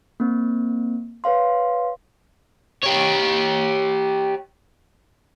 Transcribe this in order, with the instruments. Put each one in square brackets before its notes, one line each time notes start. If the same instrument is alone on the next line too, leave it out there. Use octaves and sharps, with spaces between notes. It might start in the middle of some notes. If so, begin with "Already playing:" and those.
[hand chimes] A#3 C4
B4 C#5 F5 C6
[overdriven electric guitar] G4 C#5